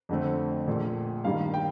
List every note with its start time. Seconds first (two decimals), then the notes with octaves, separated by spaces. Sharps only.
0.09 F2 D3 A3 C4
0.67 A#1 A#2 A3
1.24 G2 D#3 G3 A#3 F5
1.54 G5